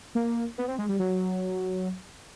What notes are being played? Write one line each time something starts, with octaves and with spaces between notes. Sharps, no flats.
A#3
B3
C4
G#3
G3
F#3